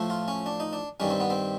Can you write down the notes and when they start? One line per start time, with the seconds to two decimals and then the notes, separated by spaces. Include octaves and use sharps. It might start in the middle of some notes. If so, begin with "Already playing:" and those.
Already playing: A2 F3 A3
0.10 F4
0.28 C#4
0.46 D4
0.60 D#4
0.73 D4
1.00 G2 D#3 G3 C#4
1.10 C4
1.20 B3
1.30 C4